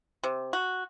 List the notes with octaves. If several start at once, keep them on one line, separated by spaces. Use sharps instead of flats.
C3
F#4